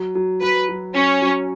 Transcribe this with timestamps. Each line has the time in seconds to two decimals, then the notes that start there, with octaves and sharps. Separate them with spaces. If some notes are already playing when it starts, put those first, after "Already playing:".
Already playing: F#3
0.15 F#3
0.42 F#3 B4
0.69 F#3
0.95 F#3 C#4
1.22 F#3